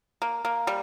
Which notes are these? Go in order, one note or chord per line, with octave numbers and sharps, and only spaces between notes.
A#3
A#3
G3